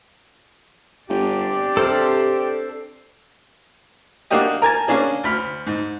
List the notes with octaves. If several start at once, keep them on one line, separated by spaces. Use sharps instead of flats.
G1 C4 D4 G4 D5
C3 A4 C5 F6
A#3 D4 F#4 G4 D#5
A#4 G#5 A5
A#3 C#4 D4 G#4
D2 B5 F6
G#2